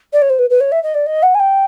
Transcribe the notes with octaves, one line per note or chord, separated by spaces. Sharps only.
D5
C#5
C5
B4
B4
C#5
E5
D#5
D5
D#5
F#5
G#5
G5